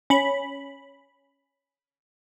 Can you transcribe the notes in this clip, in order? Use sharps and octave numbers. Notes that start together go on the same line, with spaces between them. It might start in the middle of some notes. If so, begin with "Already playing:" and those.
C#4 B5